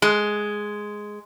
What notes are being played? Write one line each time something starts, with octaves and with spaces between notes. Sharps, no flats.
G#3